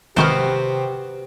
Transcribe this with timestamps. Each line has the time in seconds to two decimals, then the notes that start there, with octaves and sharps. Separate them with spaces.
0.17 G#1 C3 D#3 B3 F#4 G4 C5 F6